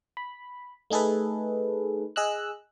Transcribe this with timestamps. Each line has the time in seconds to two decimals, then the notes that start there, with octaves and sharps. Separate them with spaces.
0.17 B5
0.90 A3 D#4 G#4 A4 B4
2.16 G#4 D#5 E6 F#6